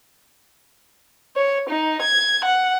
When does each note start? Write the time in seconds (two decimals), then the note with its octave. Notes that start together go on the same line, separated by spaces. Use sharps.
1.36 C#5
1.70 D#4
2.02 G#6
2.45 F#5